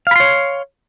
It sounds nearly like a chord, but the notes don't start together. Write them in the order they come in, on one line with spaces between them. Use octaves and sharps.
F5 B5 C6 C#5